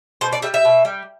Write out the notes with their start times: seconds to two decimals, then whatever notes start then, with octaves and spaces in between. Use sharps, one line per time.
0.21 B2 C5
0.33 D5
0.42 G3 E5
0.54 E5
0.65 B2
0.85 G3